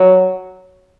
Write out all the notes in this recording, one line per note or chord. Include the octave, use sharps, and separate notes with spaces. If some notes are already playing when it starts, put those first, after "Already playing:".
Already playing: F#3